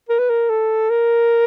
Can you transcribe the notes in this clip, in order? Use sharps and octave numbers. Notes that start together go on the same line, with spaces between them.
A#4
B4
A#4
A4
A#4